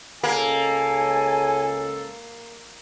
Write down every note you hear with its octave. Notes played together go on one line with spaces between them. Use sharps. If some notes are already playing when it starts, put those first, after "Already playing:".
C#2 A#3 A4 G#5